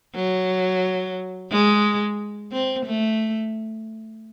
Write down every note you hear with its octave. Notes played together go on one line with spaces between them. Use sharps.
F#3
G#3
C4
A3